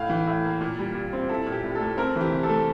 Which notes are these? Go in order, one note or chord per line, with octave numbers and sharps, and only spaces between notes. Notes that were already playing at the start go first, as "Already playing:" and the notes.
Already playing: A2 F5
E3
A2
A#3
A#2
G3
A#2
C4
E4 A4
A#2
G4
C2
A3 A4
C4 A#4
E3
G4
C3
A4
A3